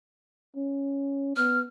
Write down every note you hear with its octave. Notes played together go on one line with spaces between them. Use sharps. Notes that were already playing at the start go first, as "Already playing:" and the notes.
C#4
B3 F6